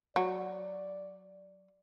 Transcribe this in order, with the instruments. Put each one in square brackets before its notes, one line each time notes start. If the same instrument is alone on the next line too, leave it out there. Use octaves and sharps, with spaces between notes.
[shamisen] F#3 [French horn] D5